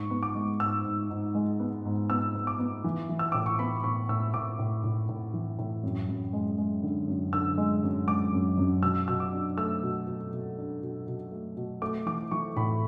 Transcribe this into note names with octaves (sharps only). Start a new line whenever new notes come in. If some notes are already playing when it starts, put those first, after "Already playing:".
Already playing: G#2 C#6
B3
D6
G#3
G#2 E6
G#2
G#2
G#3
B3
G#2
B3 E6
B3
D6
B3
E3
E3
E6
A2 D6
C#6
B3 B5
A2 C#6
A2 E6
A2 D6
A2
A2
A2
E3
A2
F#2
F#2
G#3
G#3
D3
F#2
D3 E6
G#3
F#2
G#3 D6
F#2
F#2
B2 E6
B2 E6
D6
D4
A3 E6
B2
B2
B2
D4
B2
B2
A3
B2
A3 D6
E3 D6
E3 C#6
A2 B5